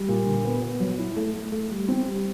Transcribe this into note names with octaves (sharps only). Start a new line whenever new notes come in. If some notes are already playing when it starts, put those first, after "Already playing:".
Already playing: G3
A#2
D3
B3
B3
F#3
E4
A3
A3
A3
G3
C4
G3